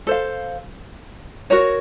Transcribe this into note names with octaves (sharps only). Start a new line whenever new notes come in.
A4 C5 F5
F#4 A#4 C#5